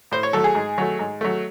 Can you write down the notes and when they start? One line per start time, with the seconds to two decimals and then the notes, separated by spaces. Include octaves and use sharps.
0.12 A2 C5
0.23 C#5
0.33 F#3 A3 A4
0.44 G#4
0.55 G#2
0.78 F#3 A3
0.99 G#2
1.21 F#3 A3